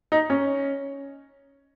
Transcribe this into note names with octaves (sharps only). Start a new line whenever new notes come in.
D#4
C#4